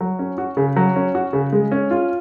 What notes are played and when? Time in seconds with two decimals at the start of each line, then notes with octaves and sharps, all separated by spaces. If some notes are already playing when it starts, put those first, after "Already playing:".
0.01 F#3
0.19 C#4
0.38 F#4
0.57 C#3
0.76 F#3
0.96 C#4
1.15 F#4
1.33 C#3
1.53 G#3
1.72 C#4
1.91 F4